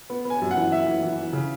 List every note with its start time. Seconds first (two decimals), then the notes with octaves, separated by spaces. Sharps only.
0.10 B3
0.25 B3
0.30 G#5
0.42 F#2
0.51 F#5
0.56 E3
0.72 F#2 E5
0.87 E3
1.02 E3
1.18 E3
1.33 C#3